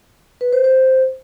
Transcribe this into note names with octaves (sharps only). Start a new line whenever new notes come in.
B4
C5
C5